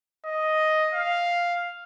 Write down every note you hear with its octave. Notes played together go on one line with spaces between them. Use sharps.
D#5
F5